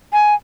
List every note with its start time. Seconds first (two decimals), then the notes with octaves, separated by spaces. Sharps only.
0.13 G#5